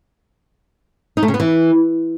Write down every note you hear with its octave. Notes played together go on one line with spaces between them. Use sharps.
D#4
A3
C#3
B3
E3